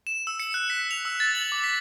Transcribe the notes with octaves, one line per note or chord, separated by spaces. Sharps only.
E7
E6
C#7
F#6
B6
F7
E6
A6
F#7
D6
B6